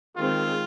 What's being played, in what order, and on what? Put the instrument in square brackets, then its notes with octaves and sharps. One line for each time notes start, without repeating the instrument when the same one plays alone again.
[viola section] D#3 G#3 C4 [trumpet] F4